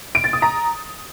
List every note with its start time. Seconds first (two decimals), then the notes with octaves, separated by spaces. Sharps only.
0.15 D7
0.24 A6
0.33 D#6
0.42 A#5